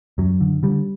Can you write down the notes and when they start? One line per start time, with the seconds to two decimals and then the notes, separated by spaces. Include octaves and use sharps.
0.18 F#2 F#3
0.41 D3
0.63 D3 G3